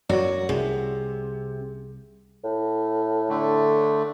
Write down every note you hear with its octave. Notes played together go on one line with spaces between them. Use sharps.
F#2 F#3 F#4 C#5 D5
C2 C3 G#4
A2
D3 A3